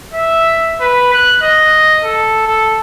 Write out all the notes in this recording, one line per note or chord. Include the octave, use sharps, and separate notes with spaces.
E5
B4
F#6
D#5
A4
A4